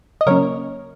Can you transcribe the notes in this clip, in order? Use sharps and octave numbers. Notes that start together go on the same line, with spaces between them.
D#5
C#3 F#3 A#3 C#4 A#4 C#5